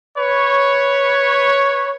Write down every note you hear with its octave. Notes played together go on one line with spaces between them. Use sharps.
B4 C#5